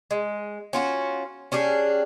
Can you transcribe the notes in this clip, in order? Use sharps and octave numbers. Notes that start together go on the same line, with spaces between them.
G#3
C#4 F4 F#4
C#4 D4 G4 G#4